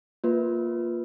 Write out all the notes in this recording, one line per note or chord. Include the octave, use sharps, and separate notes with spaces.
A#3 F4 B4